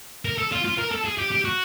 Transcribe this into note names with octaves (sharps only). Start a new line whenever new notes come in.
A#4
A4
F4
F4
A#4
A4
G#4
G4
G4
F#4